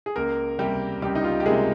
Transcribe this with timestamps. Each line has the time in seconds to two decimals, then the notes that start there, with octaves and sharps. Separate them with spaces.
0.06 G#4
0.16 C#2 A#3 A#4
0.59 C3 G3 A#3 G4
1.02 C#2 G3 G4
1.15 D#4
1.24 F4
1.40 G4
1.46 C3 G3 G#3 A#3 G#4